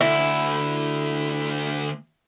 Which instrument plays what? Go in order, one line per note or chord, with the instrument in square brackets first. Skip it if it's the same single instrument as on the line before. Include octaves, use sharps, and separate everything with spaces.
[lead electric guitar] D2 [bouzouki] E4